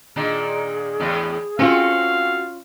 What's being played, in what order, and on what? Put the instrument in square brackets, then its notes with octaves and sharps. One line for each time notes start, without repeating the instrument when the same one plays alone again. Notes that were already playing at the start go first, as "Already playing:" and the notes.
[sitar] A#2 D#3 D4 [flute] G#4
[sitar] E2 A2
[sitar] C4 F#4 A4 [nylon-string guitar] C#4 F4 [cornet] F5